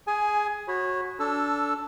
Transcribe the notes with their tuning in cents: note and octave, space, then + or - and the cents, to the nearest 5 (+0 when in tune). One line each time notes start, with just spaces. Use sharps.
G#4 +0 G#5 +15
F#4 +0 C#5 -25 B5 +0
D4 -25 A4 +0 E6 +15